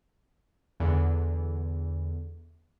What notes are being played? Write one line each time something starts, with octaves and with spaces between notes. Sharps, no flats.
E2 D3